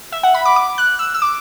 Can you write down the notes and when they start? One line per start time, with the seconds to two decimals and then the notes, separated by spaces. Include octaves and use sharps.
0.12 E5
0.23 F#5
0.34 B5
0.45 D6
0.56 D6
0.78 F#6
0.99 E6
1.14 E6
1.22 D6